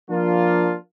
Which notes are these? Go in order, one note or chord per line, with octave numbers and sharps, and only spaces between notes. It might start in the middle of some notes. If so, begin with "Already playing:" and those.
F3 A#3 D4 F4